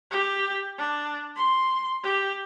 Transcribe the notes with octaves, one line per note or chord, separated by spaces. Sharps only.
G4
D4
C6
G4